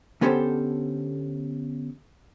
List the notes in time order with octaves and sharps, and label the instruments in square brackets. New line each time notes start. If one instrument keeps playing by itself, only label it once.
[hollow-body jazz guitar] D3 B3 C#4 G4 A4 C5